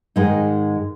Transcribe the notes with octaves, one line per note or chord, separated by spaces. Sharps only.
G#2 D#3 G#3 D#4